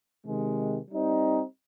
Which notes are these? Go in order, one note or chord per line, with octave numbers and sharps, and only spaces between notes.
C3 D#3 G#3
G3 C4 D#4